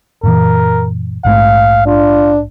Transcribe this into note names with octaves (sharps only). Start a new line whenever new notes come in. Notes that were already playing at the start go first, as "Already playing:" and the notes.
F#2 A#2 E3 A#4
A#1 G#2 A3 F5
D4 F4